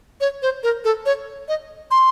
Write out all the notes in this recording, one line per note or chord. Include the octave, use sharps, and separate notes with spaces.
C#5
C5
A#4
A4
C#5
D#5
C6